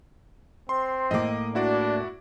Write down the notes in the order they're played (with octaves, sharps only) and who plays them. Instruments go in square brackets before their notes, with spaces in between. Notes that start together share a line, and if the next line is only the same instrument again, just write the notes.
[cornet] C4 [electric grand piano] C6
[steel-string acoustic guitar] A2 A#3 [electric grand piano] D#5 D6
[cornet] D4 [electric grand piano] E4 F#4 D5